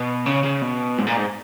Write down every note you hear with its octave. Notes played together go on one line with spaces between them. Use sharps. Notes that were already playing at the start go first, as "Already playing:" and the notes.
Already playing: B2
C#3
C#3
B2
G#2
A#2
G#2